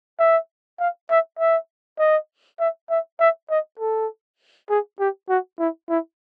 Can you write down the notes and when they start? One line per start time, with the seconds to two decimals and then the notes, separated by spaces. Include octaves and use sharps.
0.19 E5
0.79 F5
1.10 E5
1.39 E5
1.99 D#5
2.59 E5
2.90 E5
3.20 E5
3.50 D#5
3.80 A4
4.70 G#4
5.00 G4
5.29 F#4
5.59 E4
5.89 E4